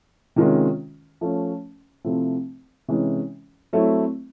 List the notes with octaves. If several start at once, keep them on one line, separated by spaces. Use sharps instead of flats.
C3 D#3 G#3 C#4 F4
F3 A3 C#4
C3 F3 A3 C4 E4
C3 E3 G#3 C#4
F#3 A3 C4 E4